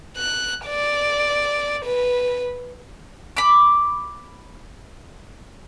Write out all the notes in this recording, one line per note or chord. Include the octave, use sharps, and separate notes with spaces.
F#6
D5
B4
B5 D6